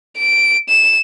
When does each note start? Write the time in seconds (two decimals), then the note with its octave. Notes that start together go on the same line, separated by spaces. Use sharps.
0.18 D7
0.69 E7